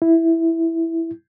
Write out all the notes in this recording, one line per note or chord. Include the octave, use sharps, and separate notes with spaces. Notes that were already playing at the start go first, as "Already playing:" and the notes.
E4